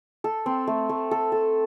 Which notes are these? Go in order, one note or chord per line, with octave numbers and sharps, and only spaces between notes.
A4
C4
A3
A3
A4
A4